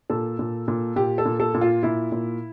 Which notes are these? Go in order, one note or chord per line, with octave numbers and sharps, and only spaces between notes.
A#2 A4
A#2
A#2
A#2 G4
A4
A#2
A4
A#2
F4
A#2 E4
A#2